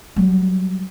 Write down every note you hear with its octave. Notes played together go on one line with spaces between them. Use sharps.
F#3 G3